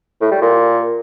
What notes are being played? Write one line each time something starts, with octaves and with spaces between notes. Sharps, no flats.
A2
G3
A#2